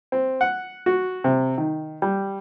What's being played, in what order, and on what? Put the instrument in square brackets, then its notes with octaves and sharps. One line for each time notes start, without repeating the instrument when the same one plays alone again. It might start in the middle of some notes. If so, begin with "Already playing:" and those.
[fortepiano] C4
F#5
F#4
C3
D#3
G3